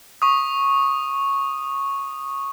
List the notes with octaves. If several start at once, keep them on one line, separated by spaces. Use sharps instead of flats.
C#6 D#6